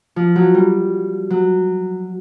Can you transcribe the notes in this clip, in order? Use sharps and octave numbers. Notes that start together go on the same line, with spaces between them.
F3
F#3
G3
F#3